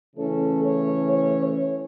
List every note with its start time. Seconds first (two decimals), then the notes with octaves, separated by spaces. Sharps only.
0.16 C#3 E3 A3 C#4 A4
0.64 C#5
1.10 C#5
1.42 C#5